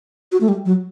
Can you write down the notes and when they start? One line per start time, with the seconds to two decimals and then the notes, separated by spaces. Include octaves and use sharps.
0.32 F#4
0.41 A3
0.48 G3
0.66 F#3